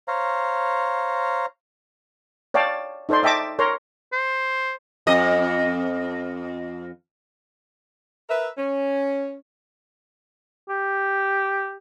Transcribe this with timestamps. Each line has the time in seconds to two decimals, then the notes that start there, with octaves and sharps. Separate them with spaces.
0.08 C5 C#5 F5 A#5
2.54 C#5 D5 F5 G5 A5
3.09 D#4 A4 C5 D5 C6
3.23 D#5 E5 G5 A5 D6
3.59 A#4 C#5 A#5 C6
4.13 C5
5.07 F2 D#5
8.30 A#4 B4 E5
8.57 C#4
10.69 G4